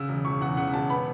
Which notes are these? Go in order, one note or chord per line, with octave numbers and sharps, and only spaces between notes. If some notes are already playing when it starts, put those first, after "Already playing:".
Already playing: C#3 E6
E1
E1 C#6
E2 F#5
C#3 F#5
E1 A5
B3 B5